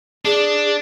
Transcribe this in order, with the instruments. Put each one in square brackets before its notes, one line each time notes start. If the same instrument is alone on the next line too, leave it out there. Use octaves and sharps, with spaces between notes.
[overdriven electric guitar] D4 [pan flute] G#4